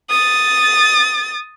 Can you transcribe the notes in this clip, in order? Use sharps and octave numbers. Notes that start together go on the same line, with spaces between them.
D#6 A6